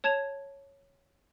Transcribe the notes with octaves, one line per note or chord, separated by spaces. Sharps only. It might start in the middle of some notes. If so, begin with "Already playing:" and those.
C#5 A5 G#6 E7 F7